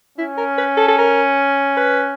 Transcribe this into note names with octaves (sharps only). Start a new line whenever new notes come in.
C#4 E4
A#4
B4
A4
A4
A#4
B4